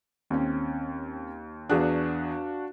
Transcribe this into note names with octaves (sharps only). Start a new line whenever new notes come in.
D#2 C4 C#4
E2 D4 F#4 G#4 F5 F#6